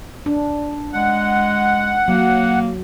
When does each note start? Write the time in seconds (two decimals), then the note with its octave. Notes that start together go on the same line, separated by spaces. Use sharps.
0.26 D4
0.92 G#3 F#5
2.08 F#3 A#3